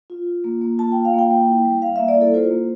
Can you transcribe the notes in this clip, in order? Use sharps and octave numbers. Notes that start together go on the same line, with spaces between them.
F4
F4
A#3
A#3
F4 A5
F4 G5
F5
A#3 G5
A#3
E4
G3
G3 F5
A#3 E5
D5
E4 A4
F4 C5
A#3